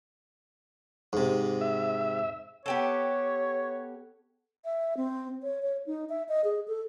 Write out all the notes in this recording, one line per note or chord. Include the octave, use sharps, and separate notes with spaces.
G#2 C3
E5
B3 G4 A4 C#5
E5
C4
C#5
C#5
D#4
E5
D#5
G#4
A4